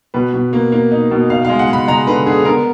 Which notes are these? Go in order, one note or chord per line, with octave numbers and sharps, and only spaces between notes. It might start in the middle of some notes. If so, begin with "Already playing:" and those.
B2 B4
B2
A#3
A#3
D#4
B2
D#4 F5
G#3 F5
F#5
G#3
B5
G#3 A#5
D3 B4
D3 G#4
B3 A#4